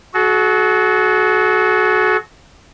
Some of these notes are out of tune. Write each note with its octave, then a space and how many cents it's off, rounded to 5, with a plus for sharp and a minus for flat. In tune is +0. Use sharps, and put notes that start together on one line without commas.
F#4 +0 A4 -45